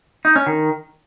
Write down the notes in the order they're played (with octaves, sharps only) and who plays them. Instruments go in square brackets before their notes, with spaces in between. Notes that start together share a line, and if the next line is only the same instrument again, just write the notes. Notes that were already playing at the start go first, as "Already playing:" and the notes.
[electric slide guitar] D#4
C#4
D#3